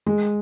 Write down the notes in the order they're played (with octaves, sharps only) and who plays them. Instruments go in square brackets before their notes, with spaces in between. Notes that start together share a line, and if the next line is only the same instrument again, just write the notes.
[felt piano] G#3